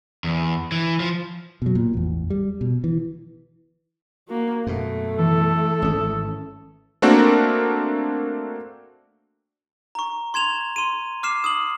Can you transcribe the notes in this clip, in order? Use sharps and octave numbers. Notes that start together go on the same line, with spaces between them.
E2
E3
F3
B2 F#3
A#2
A1 E2
G3
B2
E3
A#3 F#4
F#2 B2 A3
E3 A4
G#1 C#4 D#6
A3 A#3 C4 D4 F#4 A#4
A#5 C#6
C6 G#6 E7 F7
C6 D#7
D6 F6 C7 E7
D#6 F#7